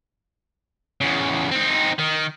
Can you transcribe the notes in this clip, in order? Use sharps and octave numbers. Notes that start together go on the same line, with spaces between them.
E2 C#3
C4 D#4
D#3